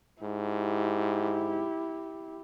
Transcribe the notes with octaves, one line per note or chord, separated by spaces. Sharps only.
G#2 E4 G4